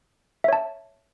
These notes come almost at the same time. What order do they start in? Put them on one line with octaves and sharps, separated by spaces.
E5 C#5 A5